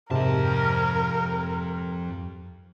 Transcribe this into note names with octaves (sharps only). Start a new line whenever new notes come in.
F2 G#2 C3 A#4 A5